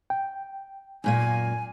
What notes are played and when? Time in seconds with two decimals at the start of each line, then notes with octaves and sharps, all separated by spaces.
0.10 G5
1.04 F#2 A#2 A#3 G#5